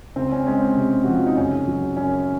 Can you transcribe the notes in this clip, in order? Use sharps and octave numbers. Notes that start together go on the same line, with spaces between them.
C#2 C4
C#4
G#3 C#4
C4
C3
F3 F#4
F4
D#4
F#1 C#4
F#3
F#2 C#4